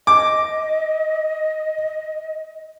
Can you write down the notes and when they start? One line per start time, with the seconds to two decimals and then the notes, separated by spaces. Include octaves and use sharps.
0.07 D#5 D6